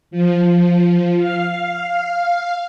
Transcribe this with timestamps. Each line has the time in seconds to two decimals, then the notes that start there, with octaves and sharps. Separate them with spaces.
0.11 F3
1.18 F5